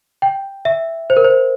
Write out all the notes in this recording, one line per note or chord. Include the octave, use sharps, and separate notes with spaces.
G5
E5
C5
A#4
C5